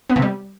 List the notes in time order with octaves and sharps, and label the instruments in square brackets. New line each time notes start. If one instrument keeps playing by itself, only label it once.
[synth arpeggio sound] B3
C3
G3